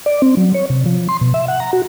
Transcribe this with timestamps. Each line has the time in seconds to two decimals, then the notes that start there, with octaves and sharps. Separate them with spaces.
0.06 D5
0.22 C4
0.37 F#3
0.54 C#5
0.70 C3
0.86 F3
1.09 C6
1.21 B2
1.34 E5
1.48 F#5
1.60 A#5
1.73 F#4